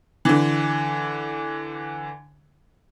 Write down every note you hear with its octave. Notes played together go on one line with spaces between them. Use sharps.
D3 E3